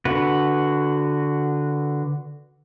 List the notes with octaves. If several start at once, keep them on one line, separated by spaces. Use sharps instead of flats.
D3 F#4 B4